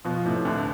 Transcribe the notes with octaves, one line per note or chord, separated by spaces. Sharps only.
B2 F3
A2 C3
D2 D3 A3